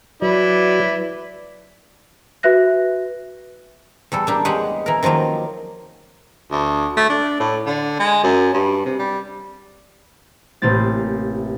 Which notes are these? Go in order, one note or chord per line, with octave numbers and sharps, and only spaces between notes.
F#3 E4 B4 D5
F#4 B4 E5 F#6 A#6
E2 G3 A4
A#3 D4 G4
E2 G#3 G4 G#4 C#5 F#5
E3 A#4
D#3 F3 F#3 A#3
D2
A3
D4
A2
D3
G#3
F#2
G2
C3
G3
A1 C3 A#3 C4 A6